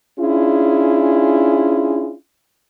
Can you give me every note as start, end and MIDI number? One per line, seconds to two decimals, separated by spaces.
0.19 2.14 61
0.19 2.14 62
0.19 2.14 64
0.19 2.14 65
0.19 2.14 68